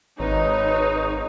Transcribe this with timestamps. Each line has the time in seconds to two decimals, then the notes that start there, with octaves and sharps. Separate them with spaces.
0.20 G#1 D#4 B4 C#5